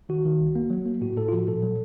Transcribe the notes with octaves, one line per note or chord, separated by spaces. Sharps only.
D#3 F#4
D#3
C2
A#3
F#3
A#3
A2 F#4
A2 A4
F4
F3 F#4
A#2 A4
F#3